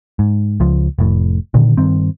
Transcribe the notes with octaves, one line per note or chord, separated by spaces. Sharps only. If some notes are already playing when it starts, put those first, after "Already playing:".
G#2
C#2 F3
F1 A2
A#2 D3 D#3
G2 D#3 C4